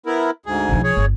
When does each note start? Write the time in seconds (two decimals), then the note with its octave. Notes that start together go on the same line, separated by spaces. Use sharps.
0.06 B3 E4 A#4
0.46 D2 G#2 G#4
0.69 B1 F3
0.84 G#4 C#5
0.97 G1